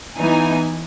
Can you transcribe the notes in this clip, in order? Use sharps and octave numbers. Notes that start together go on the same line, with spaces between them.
E3 B3 D#4 G#5